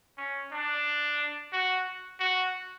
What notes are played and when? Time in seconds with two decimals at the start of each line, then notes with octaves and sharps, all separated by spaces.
0.18 C#4
0.52 D4
1.52 F#4
2.20 F#4